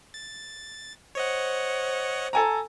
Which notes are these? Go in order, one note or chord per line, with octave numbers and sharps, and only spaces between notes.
A6
C5 C#5 D#5 F#5
A4 G#5 A#5